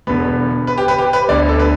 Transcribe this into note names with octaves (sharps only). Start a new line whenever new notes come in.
E1 E2 D3 B3 B4
B4
G4
B4
G4
B4
D2 D3 B3 D5
A4
B4